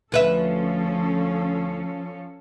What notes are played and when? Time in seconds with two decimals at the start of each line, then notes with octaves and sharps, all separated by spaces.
0.12 D2 F3 C#4 A4 B4 E5